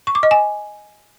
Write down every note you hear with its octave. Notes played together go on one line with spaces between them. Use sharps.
C#6
D6
D#5
G#5